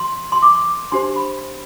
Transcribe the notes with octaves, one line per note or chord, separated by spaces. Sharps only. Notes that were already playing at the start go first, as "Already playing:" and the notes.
Already playing: C6
C6
D6
D4 G4 C5 C6
B5